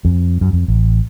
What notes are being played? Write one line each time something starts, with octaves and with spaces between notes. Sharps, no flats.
F2
F#2
F2
A1